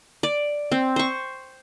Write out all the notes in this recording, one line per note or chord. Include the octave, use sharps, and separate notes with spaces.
D5
C4
C5 C#6